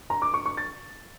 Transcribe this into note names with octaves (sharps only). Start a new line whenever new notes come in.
A#5
D6
C#6
C#6
A6